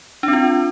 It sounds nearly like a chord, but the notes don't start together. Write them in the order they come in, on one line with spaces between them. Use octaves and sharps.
D4 C4 F4